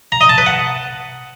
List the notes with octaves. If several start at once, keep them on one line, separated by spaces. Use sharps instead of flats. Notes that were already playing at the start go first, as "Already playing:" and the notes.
A#5
D#5
A5
B4
F#5